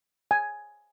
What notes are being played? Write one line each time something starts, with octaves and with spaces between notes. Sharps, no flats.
G#5